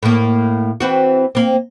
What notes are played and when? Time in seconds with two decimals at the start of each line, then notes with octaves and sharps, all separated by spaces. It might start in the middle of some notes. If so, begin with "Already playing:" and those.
0.03 A2 A#3
0.80 E3 C4 F#4
1.35 A#3 C4